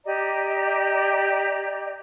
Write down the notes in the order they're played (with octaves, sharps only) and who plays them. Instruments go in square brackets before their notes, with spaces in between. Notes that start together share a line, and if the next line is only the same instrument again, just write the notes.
[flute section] G4 D5 D#5 A#5